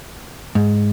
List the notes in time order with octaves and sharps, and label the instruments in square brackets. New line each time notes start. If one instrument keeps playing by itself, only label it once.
[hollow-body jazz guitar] G#2